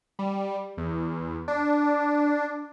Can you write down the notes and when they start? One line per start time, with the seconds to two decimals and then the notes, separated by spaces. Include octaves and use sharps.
0.19 G3
0.77 E2
1.48 D4